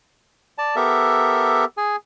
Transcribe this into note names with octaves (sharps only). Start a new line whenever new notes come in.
D5 A5
B3 G4 A4 A#4 E5
G#4 G#5